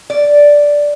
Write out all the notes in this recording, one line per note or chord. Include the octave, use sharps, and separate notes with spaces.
D5